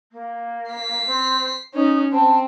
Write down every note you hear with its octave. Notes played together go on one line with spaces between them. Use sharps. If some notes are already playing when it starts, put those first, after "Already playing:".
A#3
B6 C7
C4
C#4 D#4
C4 A5